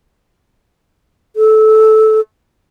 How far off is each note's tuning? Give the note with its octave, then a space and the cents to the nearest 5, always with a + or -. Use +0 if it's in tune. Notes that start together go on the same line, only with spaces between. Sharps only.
A4 -15